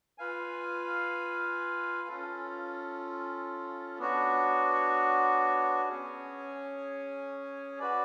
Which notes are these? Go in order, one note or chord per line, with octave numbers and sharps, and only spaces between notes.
F4 B4 F5 G#5
C#4 F4 A4
B3 D4 F#4 C#5
C#4 G#4 C#5 G#5
F#4 B4 D5